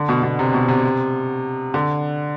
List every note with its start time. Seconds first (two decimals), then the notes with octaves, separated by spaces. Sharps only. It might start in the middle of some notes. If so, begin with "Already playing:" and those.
Already playing: D3
0.09 B2
0.23 B2
0.39 C3
0.54 B2
0.68 C3
1.74 D3